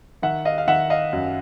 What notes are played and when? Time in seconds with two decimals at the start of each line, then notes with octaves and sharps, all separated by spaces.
0.22 D#3 E5 F#5
0.45 D#5 F5
0.58 F5
0.68 D#3 E5 F#5
0.90 D#5 F5
1.13 F#2